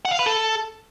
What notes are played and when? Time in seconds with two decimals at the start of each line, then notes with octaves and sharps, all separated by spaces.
0.05 F#5
0.12 F5
0.19 B4
0.26 A4